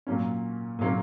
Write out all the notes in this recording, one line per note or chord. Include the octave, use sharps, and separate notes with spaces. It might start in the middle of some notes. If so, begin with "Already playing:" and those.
A#2 F#3 A#3 C#4
A#2 F#3 A#3 C#4